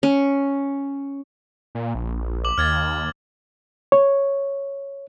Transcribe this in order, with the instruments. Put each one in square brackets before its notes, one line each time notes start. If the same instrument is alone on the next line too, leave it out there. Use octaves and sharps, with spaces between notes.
[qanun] C#4
[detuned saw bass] A#2
A#1
[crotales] D6 F#7
[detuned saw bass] D#2 [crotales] F6 G#6 A6
[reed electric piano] C#5